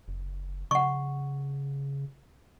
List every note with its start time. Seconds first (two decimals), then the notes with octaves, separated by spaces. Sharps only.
0.08 F#1
0.71 C#3 F#5 C#6